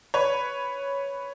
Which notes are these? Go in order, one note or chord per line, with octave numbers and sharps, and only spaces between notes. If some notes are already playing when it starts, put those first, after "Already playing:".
B4 C#5